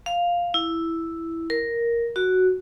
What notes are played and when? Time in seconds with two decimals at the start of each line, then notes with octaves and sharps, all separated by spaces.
0.06 F5
0.54 E4
1.50 A#4
2.16 F#4